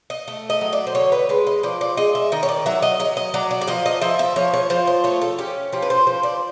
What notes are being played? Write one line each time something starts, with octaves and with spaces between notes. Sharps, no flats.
D#5
A3
D#5
F#3
D5
C5
D3 C#5
B4
G#3 B4
D#5
F3 D5
D5
G#3 D#5
E5
D#3 D#5
C#5
D5
F#3 E5
D#5
F#3 D#5
D#5
F#3 D5
D5
D5
F3 D#5
D#5
F3 E5
E5
F3 C#5
C#5
F3 C5
C5
A3 C#5
A4
C#4 G4
F3 G4
B4
C5
F3 C5
D5